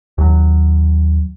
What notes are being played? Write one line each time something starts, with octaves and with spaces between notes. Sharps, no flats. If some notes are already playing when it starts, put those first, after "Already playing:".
D#2 F#3